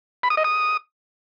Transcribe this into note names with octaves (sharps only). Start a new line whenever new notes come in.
B5
D#6
D#5
D#6